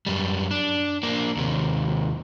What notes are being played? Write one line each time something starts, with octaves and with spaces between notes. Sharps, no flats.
F#2 G3
D4
A#3 D4
D#2 C3